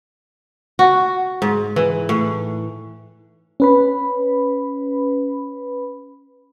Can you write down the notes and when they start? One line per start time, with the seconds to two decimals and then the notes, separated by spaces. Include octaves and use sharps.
0.79 F#4
1.42 G#2
1.76 E3
2.09 A2
3.60 C#4 B4 B5